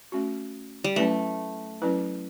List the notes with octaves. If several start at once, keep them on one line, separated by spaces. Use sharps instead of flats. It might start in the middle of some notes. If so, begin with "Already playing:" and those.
A3 C#4 F#4
G3
F#3 A3 C#4 E4 B4
F#3 C#4 E4 B4